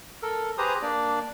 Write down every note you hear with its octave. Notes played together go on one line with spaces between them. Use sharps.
A4 A#4
G4 G#4 B4 C5 A#5 D#6
A#3 D4 D5